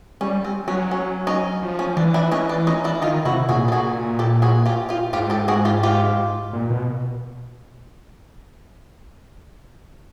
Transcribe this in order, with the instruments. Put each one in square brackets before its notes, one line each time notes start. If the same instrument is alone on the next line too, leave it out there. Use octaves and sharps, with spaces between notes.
[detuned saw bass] G3 [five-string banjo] C#4
[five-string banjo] C4
[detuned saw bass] F#3 [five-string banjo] C#4
[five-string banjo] C#4
C#4 D#4
[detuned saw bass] F3
[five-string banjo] C#4
[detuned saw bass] E3 [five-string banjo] D4
[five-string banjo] D4 E4
C#4 D#4
D4
C#4 D#4
D4 E4
[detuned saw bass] D#3 [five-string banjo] D#4 F4
[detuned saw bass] C3 [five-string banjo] E4 F#4
[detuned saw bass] A#2 [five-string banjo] F#4 G#4
[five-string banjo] A4
F#4 G#4
G4 A4
F#4 G#4
F4 G4
F4 G4
[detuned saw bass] G#2 [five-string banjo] F4 G4
[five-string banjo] G4 A4
F#4 G#4
F4 G4
F4 G4
[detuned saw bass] A#2
B2